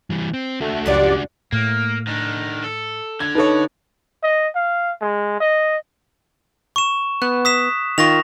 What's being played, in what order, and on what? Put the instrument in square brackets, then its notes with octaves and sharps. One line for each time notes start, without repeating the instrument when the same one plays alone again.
[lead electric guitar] E3 G3
C4
[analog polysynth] A3 [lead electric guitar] D4 F#4
[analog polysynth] C#2 D5 F#5 [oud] F#2 F3 G4
[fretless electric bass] A2 [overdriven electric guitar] A#3
[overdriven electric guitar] D#3 D4
A4
[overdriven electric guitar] D3 [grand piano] G#6
[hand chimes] D#4 A4 [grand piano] B4 C#5
[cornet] D#5
F5
G#3
D#5
[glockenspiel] C#6 E7
[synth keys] B3 [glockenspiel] F#6
[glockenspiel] D#6 B6 E7
[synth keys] D#3 F4 [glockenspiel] C#6 A#6 F7